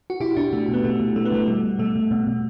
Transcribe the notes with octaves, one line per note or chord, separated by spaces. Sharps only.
F#4
B2 E4 G4
B2 D4 F#4
B2 A3
B2 B3
B2 A3
B2
B2 A3
B3
B2 A3
B2 G3
B2
B2 A3
B2
B2
B2